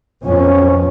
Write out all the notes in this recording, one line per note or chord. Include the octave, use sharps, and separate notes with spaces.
F2 B2 F3 C#4